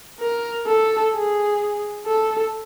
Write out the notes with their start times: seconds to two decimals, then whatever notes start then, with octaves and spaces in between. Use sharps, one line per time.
0.20 A#4
0.67 A4
1.13 G#4
2.06 A4